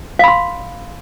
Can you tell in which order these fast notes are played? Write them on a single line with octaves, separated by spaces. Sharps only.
F5 B5 C6